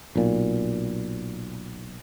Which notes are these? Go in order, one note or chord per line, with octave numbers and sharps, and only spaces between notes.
B1 A#2